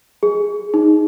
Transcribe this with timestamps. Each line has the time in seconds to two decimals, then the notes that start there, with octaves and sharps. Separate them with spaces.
0.23 G#4
0.74 D#4